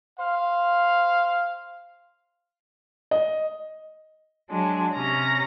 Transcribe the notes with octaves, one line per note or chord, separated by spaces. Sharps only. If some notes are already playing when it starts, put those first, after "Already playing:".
C5 F5
D#5
F#3 G#3 D4
C3 C#4 A#5 A#6